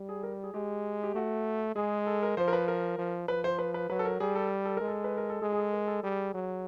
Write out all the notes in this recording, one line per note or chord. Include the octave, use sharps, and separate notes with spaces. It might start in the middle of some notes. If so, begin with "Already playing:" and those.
Already playing: G3
G#4
A#4
G#4
G#3 G4
G4
A3 F#4
G#3 G#4
A4
A#4
F3 C5
A#4
B4
A#4
F3
F3 B4
C5
B4
B4
F#3 B4
A4
A#4
G3 G#4
A4
A4
G#3 A#4
A4
B4
A#4
A4
G#3 G#4
G#4
A4
A#4
A4
G3 G#4
F#3